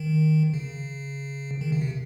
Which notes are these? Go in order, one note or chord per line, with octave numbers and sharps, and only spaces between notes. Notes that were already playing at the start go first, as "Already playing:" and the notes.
Already playing: D#3
C#3
D#3
C#3
C3